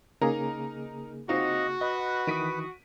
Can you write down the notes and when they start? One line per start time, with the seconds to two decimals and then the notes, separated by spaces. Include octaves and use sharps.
0.21 C#3 A#3 D#4 G#4 A#4 A#5
1.29 C4 D#4 F4 F#4 D#5
1.81 B4 D#5
2.27 D#3 E3 D#6 B6 D7 D#7